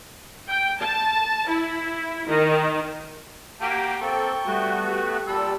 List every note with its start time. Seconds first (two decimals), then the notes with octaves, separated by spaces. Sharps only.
0.49 G5
0.81 A5
1.49 E4
2.28 D#3
3.61 A#3 F#4 G4 G5
4.01 A#3 C4 A4 G5 C#6
4.46 G3 A3 B3 F#4
4.89 G4
5.27 A#2 G3 A4 B5 E6